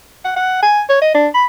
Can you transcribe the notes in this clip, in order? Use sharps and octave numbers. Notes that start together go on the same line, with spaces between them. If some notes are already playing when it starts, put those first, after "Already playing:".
F#5
F#5
G#5
C#5
D#5
D4
B5